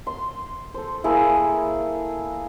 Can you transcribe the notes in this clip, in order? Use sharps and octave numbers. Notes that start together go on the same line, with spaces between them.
C6
A4 C5
A#3 E4 G#4 A4